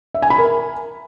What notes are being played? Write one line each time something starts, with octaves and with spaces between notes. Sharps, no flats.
E5
G#5
B5
A#4